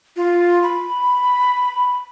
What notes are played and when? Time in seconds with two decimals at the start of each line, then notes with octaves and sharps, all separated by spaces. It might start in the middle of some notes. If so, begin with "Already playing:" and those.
0.16 F4
0.63 B5